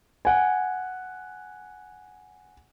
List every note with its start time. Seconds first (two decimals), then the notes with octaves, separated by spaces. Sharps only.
0.25 F#5 G#5